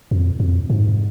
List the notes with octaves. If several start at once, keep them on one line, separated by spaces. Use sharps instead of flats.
F2
F2
G#2